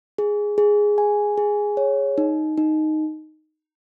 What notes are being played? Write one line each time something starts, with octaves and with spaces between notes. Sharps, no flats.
G#4
G#4
G#5
G#4
C#5
D#4
D#4